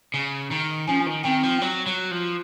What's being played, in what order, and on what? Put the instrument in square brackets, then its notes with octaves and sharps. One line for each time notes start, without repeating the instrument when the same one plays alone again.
[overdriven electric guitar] C#3
D#3
[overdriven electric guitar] F3 [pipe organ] C#4
[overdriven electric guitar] D#3
[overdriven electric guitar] D#3 [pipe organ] C4
[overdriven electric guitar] F3
F#3
F#3
F3